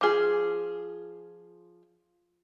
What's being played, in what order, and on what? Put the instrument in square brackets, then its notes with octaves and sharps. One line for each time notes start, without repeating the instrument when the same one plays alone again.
[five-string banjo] F3 G#4 [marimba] F4 D6